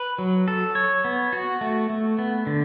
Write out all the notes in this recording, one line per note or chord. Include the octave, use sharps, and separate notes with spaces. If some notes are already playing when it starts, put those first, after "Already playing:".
Already playing: B4
F#3
A4
C#5
B3
F#4
A3
A3
B3
D3